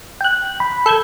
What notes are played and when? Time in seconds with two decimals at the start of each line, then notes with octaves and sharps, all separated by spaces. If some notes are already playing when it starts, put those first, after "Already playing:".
0.21 G5 F#6
0.60 B5
0.86 A4 G6 G#6